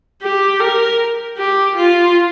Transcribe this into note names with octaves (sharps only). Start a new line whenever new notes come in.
G4
A#4
G4
F4